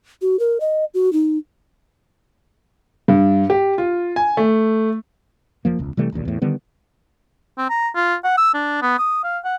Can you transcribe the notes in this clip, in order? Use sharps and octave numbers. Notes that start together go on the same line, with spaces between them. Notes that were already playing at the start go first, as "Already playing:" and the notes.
F#4
A#4
D#5
F#4
D#4
G2
G4
F4
G#5
A3
F1 F3 A#3
E1 C#2
C3 E3 G3 A3
D1 A#1 D#2 A#2
E2 A2
D3 D#3 G3 B3
C4
A#5
F4
F#5
E6
D4
B3
D#6
F5
F#5